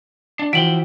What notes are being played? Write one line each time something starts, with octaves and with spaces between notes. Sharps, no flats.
D4
E3 F3 F#4 E5 G5 D7 F#7 G7